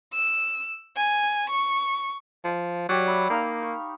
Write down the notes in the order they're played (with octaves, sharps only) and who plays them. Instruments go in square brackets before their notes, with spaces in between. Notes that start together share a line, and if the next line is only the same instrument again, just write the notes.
[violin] E6
G#5
C#6
[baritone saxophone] F3
[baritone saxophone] F#3 [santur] G4 D5
[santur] E5 B5
[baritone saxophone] A#3 [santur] D#4 F5
[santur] C#6